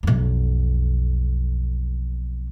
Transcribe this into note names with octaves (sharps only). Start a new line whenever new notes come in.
B1 F2